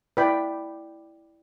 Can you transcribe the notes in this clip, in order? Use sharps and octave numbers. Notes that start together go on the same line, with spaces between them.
E4 B4 D5 G5 B5